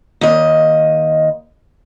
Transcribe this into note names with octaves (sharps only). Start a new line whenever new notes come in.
D#2 D#5